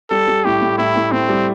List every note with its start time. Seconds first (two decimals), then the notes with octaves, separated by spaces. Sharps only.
0.10 G3 A4
0.27 G3
0.44 A2 G4
0.61 A2
0.78 A2 E4
0.95 A2
1.12 A2 C4
1.29 G3